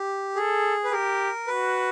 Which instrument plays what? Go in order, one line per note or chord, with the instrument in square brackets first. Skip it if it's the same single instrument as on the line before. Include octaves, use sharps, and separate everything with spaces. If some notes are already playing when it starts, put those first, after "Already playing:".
Already playing: [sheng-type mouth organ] G4
[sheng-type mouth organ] G#4 [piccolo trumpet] A4
[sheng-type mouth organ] B4
[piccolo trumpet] G4 [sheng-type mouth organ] A#4
[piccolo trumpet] F#4 [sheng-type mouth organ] B4